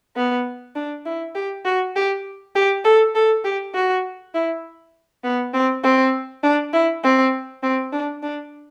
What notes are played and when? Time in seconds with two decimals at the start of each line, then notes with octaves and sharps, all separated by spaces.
0.16 B3
0.76 D4
1.05 E4
1.35 G4
1.65 F#4
1.96 G4
2.55 G4
2.84 A4
3.15 A4
3.45 G4
3.74 F#4
4.34 E4
5.24 B3
5.54 C4
5.84 C4
6.43 D4
6.73 E4
7.04 C4
7.63 C4
7.92 D4
8.23 D4